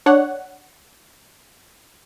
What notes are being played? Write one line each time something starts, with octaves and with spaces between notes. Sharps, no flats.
D4 C#5 F#5